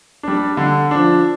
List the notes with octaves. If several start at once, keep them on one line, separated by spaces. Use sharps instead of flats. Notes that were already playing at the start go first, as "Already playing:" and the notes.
G3 D4
D3
F3 D4